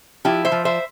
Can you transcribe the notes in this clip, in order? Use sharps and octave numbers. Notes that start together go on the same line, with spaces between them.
F3 E4 G4
C5 E5
F3
C5 E5